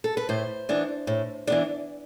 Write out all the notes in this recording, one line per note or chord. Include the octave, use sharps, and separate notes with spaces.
A4
B4
A2 C5
E3 B3 D4
A2
E3 B3 D4